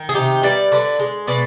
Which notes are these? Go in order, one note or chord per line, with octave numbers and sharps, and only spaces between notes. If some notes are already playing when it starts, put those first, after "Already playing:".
Already playing: D#3
G#4
C3 D#4 G4
G3 B4 D5
D3 B4 D5
G#3
B2 B4 D5